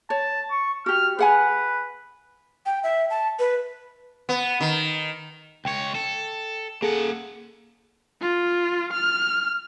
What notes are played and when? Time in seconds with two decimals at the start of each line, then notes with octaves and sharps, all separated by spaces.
0.10 C#5 A5
0.51 C#6
0.86 F#4 G4 F6
1.19 G#4 B4 F#5 G#5
2.66 G5
2.83 E5
3.10 A5
3.39 B4
4.29 B3
4.61 D#3
5.65 C#2 C#5 G5
5.95 A4
6.82 A#3 G#4 A4 F#5
8.22 F4
8.93 F6